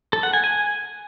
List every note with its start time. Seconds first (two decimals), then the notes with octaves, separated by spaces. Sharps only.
0.13 A4
0.23 F#5
0.33 G#5
0.44 G#5